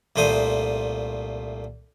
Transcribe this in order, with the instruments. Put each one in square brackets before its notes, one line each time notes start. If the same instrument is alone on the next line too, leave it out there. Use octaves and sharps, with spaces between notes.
[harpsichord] C2 A#2 A3 C5 D#6